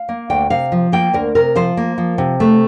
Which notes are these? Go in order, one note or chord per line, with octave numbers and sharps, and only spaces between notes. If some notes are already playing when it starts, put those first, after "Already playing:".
Already playing: F5
A#3
D2 G5
C3 F5
F3
A#3 G5
D2 A#4
C3 A#4
F3 C5
A#3
F3
C3
A3